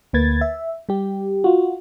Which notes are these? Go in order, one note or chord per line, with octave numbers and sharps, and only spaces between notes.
D2 A#3 B4 G#6 A6
E5
G3 G4
F4 F#4